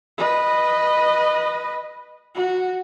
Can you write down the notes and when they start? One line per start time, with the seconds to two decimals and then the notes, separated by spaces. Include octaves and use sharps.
0.18 B4 D#5
2.35 F#4